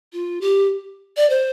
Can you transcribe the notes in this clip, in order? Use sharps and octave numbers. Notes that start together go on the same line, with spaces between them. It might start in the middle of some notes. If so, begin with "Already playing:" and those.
F4
G4
D5
C5